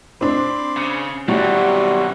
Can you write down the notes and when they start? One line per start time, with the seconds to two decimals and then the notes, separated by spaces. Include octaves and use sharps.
0.21 C4 D4 B5 C6 D6
0.77 C#3
1.28 F#2 B2 E3 F#3 G3 C4 F#4 F#5